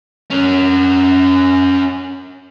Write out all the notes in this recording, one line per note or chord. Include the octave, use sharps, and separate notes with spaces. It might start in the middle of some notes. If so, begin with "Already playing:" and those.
C#4 A#4